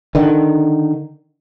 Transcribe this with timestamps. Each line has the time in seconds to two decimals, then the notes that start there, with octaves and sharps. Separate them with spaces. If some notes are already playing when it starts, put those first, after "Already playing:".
0.15 D3 D#3